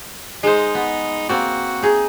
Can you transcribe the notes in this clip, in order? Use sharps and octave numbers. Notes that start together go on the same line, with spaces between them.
G#3 D#4 C5
B3
A#3 C4 F#4 D5
D#4 G#4